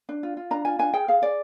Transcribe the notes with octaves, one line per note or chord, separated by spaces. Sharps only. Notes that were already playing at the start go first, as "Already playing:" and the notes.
D4
F4
F4
D4 A#5
F4 G#5
D4 G#5
G#4 G5
G#4 F5
G#4 D5